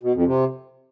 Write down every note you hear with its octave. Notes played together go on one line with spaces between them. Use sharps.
B2
F2
C3